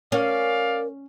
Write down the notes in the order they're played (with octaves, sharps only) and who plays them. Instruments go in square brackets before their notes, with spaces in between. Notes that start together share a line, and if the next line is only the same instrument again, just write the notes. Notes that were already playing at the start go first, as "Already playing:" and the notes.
[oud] C#4 [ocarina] A#4 [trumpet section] D5 F5